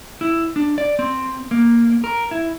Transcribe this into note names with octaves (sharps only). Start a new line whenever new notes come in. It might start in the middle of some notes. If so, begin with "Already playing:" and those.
E4
D4
D5
C4
A#3
A#4
E4